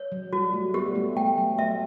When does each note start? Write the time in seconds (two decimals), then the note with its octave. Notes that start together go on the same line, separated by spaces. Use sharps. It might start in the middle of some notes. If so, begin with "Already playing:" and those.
Already playing: C#5
0.12 F#3
0.33 G3 F#4
0.53 A3
0.74 G3 B3 G4
0.95 A3
1.16 A3 G5
1.38 F#3
1.58 A3 E5